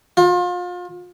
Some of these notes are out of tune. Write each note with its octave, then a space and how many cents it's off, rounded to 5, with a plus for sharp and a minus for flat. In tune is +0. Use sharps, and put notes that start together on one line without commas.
F4 +35